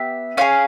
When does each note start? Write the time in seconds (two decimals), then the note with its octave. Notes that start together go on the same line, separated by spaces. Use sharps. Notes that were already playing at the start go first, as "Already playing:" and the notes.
Already playing: B3 G4 E5
0.37 C#4 F4 G#4 F5